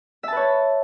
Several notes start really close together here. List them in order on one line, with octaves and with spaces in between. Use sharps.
E5 A5 B4 C#5